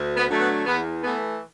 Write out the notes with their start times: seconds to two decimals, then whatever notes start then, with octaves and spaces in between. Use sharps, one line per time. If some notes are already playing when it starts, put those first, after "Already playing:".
Already playing: D2
0.16 B3
0.28 D3 F#3 A3
0.41 B3
0.65 E2 B3
1.02 E3 A3 B3